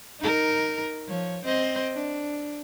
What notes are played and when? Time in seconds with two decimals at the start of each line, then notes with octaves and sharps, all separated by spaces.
0.20 D#4 A#4
1.07 F3 C#5
1.45 C4 C5 D#5
1.93 D4